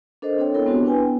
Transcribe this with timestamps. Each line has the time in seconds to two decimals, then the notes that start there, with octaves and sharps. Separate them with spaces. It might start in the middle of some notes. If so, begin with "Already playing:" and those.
0.22 D4 A4 A#4 C5 D#5
0.38 C4 D4 A4 C#5 G5
0.54 B3 E4 A4 A#4 C#5
0.65 G#3 B3 C4 D4 F#4 G4
0.84 D4 E4 B4 G5 G#5
0.98 B3